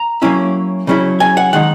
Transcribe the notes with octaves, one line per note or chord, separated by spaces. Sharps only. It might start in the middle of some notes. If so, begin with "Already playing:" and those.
Already playing: A#5
F#3 A#3 C#4 E4
C#3 F#3 C#4 E4
G#5
F#5
D#3 G#3 D#4 F#5